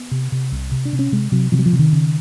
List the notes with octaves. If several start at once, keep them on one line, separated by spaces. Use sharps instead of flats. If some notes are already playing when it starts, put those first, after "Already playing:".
Already playing: B3
C3
C3
C2
C3
D4
C3
C#4
C3 G#3
C3 F#3
C3 F3
F#3
F3
C3
D#3
C#3